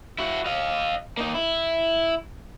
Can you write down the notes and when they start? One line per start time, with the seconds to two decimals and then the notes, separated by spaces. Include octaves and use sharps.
0.18 E4 F#4
0.46 D#5 F5
1.17 A#3 D#4
1.34 E4